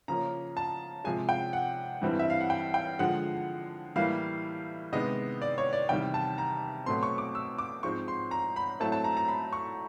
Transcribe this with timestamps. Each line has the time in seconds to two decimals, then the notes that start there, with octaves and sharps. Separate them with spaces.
0.08 C#3 F3 A#3 C#4 A#5
0.57 A5
1.04 C3 F3 G#3 G#5
1.29 G5
1.53 F#5
2.02 G2 E3 G3 C4
2.19 E5
2.30 F5
2.41 F#5
2.50 G5
2.74 G5
2.99 D3 F3 G#3 F#5
3.96 A2 E3 G3 A#3 F5
4.92 C3 D#3 G#3 B3 D#5
5.42 D5
5.58 C#5
5.73 D5
5.89 E2 C3 D#3 G3 G5
6.14 A5
6.38 A#5
6.86 B2 F#3 A3 C4 C6
7.03 C#6
7.18 D6
7.35 E6
7.58 D6
7.83 G#2 F3 G#3 C4 C#6
8.08 C6
8.31 A#5
8.56 B5
8.80 A2 F#3 A3 C4 A5
8.92 A5
9.04 A#5
9.17 A#5
9.28 B5
9.53 C#6